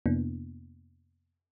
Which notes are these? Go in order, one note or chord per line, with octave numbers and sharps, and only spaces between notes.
F2 C3 A#3 B3 D4 E4